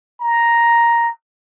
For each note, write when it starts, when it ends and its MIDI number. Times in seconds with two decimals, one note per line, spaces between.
0.21 1.10 82